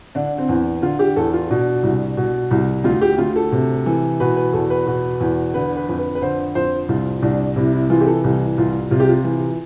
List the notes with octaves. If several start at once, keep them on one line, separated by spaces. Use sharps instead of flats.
D3 D4
C4
E2
D3 F4
G4
E2 A4
F4
B2 D4
C2
B2
C2
D2 F4
G4
D2 F4
A4
C3
E3
B2 B4
B4
E2 A4
B4
B2
E2
D3 B4
B4
F2
B4
B4
D3 C5
F2 C5
C2 F4
C2 D4
C3 E4
E4
E3 F4
G4
A4
C2
C2 F4
C3 F4
G4
F4
E3